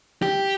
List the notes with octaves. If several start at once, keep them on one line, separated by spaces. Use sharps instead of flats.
G4